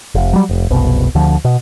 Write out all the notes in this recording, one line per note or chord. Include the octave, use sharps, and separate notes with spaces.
F1
F#3 G3
F1
F#1 C2 B2
D2 D3 F3
B2